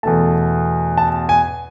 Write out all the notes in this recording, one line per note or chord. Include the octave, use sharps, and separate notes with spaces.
E2 B2 A3 A5
A5
G#5